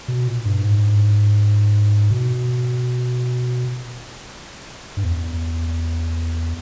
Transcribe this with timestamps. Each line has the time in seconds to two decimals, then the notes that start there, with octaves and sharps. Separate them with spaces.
0.08 B2
0.28 A#2
0.45 G2
0.64 G#2
2.11 B2
4.97 G2
5.04 E2